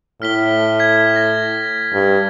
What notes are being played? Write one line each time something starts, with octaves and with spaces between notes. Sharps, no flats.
A2 F6 B6 G7
G#6 B6
A#6
G2